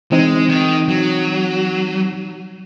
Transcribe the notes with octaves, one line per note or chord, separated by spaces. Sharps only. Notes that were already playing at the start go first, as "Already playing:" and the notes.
E3 G#3 C4 D#4
D#3
F#3